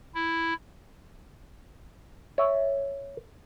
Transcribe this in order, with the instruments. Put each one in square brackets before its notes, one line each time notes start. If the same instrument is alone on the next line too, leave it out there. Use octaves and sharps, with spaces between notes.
[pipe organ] E4
[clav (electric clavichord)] C#5 E5